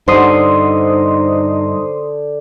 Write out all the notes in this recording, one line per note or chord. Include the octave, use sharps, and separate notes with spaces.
G2 D3 D#4 C5 C6 D#6